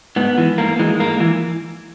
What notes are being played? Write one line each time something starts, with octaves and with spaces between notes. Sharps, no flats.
G#2 B3
E3
G#2 A#3
E3 G#3
G#2 A#3
E3